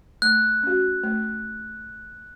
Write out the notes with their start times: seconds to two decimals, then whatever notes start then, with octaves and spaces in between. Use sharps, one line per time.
0.22 A3 F#6
0.63 C#4 F#4
1.03 A3